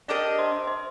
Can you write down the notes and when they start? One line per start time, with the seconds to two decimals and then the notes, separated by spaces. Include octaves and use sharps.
0.08 D4 G4 A#4 D5 D#5 D6
0.39 C5 C6
0.67 C5 C6